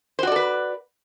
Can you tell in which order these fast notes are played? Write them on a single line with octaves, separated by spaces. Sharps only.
C5 F#4 D5 A4 B4